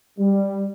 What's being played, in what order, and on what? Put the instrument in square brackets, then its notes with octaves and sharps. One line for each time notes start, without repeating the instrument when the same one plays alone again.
[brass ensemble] G3